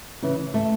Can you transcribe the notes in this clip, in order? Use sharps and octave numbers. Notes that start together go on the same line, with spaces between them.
C#3 E3
A3